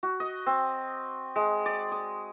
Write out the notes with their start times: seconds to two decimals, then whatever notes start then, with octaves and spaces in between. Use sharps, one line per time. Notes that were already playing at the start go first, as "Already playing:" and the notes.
0.03 F#4
0.20 D#5
0.46 C4
1.36 G#3
1.66 D5
1.92 D#6